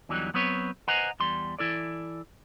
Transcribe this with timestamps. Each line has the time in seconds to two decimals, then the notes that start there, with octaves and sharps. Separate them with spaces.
0.09 E2 D3 E3 F#3 G3 D#4
0.34 F#3 B3 C4 B4 C#5
0.88 B4 C5 D#5 F#5 G#5 A#5
1.20 E2 G3 C6
1.59 E3 E4 A4 D5